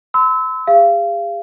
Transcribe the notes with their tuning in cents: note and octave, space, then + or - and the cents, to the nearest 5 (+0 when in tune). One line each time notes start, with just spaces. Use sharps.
C6 -40 E6 -20
G#4 -40 F5 -30